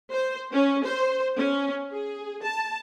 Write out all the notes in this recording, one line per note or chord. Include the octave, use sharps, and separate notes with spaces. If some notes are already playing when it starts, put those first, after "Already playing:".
C5
C#4
C5
C#4
G#4
A5